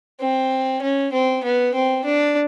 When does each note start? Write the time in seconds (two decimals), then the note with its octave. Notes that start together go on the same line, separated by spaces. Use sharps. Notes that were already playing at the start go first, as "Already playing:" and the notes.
0.20 C4
0.82 C#4
1.12 C4
1.43 B3
1.74 C4
2.05 D4